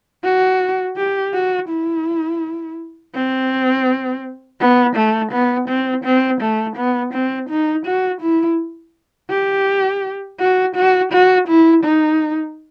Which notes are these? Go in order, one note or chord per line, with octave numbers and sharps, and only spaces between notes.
F#4
G4
F#4
E4
C4
B3
A3
B3
C4
C4
A3
B3
C4
D#4
F#4
E4
G4
F#4
F#4
F#4
E4
D#4